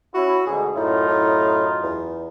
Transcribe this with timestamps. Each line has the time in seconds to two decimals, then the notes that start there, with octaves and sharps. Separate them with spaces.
0.14 C#4 E4 F#4
0.46 D2 G#2 B2 G#4
0.75 F#2 A2 D#4 F4
1.08 A2
1.83 E2